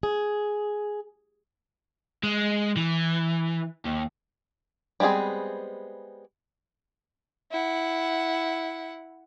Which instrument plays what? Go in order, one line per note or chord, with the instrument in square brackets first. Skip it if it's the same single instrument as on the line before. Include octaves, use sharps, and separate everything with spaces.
[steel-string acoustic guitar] G#4
[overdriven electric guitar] G#3
E3
D#2
[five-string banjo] G3 G#3 B3 C4 G#4
[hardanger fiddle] E4 F#5